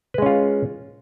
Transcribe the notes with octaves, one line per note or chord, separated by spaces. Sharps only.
G#3 C#4 F4 B4